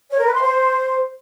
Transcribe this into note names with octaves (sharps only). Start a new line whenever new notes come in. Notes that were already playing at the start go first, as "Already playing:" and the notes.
C#5
A#4
B4
C6
C5